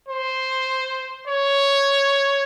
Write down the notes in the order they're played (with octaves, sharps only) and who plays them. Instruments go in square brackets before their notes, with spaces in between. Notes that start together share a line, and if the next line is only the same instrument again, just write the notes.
[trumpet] C5
C#5